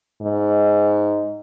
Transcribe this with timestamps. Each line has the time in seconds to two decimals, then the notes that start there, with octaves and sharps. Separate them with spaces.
0.21 G#2